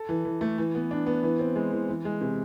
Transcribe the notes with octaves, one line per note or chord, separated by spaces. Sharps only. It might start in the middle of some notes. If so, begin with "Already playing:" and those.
Already playing: A4
E3
E3
A3
E3
B3
D4
B3
E3
C4
G#3
E3
E3
G#3
C3